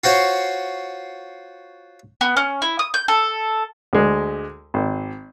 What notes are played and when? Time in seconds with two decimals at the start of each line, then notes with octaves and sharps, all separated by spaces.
0.04 F4 F#4 C5 C#5
2.21 B3
2.37 C#4
2.62 E4
2.79 D#6
2.94 G6
3.08 A4
3.93 D2 G#3
4.74 G#1